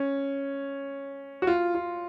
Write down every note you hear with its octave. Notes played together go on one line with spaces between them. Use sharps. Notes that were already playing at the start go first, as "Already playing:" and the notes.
Already playing: C#4
F#4
F4
F4